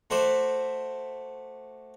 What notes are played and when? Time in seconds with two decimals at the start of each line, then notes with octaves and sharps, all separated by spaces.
0.10 A3 F#4 C5 D5 E5